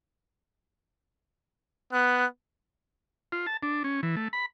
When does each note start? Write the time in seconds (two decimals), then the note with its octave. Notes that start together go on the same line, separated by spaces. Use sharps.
1.93 B3 F#6
3.32 F4
3.47 A5
3.63 D4
3.84 C#4
4.03 E3
4.16 A3
4.33 B5